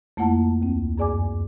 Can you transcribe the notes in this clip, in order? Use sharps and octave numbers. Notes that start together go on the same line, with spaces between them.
F2 A3 A#3 E4 F#5 A5
D2 C4
F#2 G#4 D5 G#5 D6